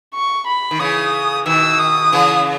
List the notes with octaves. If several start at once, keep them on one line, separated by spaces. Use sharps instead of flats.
C#6
B5
D#3
C#3 E3 D#6
B2 D#3 E6
D#6
C#3 E3